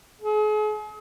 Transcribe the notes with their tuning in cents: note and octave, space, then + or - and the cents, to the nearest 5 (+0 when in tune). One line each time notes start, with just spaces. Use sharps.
G#4 +40